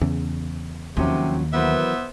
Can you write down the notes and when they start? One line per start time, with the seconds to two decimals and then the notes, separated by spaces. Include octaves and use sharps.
0.01 E2 C#3
0.97 D#2 C3 F3 F#3 C#4
1.53 E3 F#3 B3 A#4 C5 E5